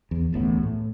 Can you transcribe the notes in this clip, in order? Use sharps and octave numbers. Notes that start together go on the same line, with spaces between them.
E2
D1 A1 A2 B3
A2